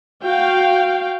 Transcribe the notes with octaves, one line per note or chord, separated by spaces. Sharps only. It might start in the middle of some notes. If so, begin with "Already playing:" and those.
F#4 F5 G5